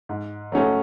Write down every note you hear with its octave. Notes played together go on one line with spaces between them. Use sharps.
G#2
F#3 A3 C#4